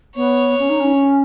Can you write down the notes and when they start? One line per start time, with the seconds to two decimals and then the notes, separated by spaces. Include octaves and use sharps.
0.16 B3 C#5
0.59 C#4
0.69 D#4
0.80 C#4